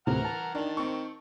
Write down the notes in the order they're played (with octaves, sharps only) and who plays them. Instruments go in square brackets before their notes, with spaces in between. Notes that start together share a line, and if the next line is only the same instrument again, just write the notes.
[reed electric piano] D2 A2 C3 [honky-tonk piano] E3 [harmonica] F#5 A#5 F6
[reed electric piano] A5
[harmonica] D#3 [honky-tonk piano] D4
[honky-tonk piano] C4 C#6